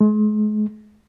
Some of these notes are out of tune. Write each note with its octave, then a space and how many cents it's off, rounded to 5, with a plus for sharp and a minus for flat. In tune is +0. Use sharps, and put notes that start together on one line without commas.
G#3 +40